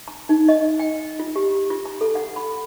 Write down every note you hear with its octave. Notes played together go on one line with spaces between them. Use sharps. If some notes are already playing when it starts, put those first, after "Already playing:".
A#5
D#4
D#5
G5
F4
G4
F4
A#5
A4
F#5
B5